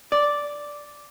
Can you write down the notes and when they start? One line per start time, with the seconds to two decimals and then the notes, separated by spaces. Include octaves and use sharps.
0.12 D5